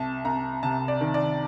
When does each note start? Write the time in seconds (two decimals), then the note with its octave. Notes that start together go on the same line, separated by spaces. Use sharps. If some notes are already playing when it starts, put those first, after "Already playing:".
Already playing: C2 A5
0.25 C2 A#5
0.63 C3 A5
0.88 D5
1.01 D#3
1.14 D5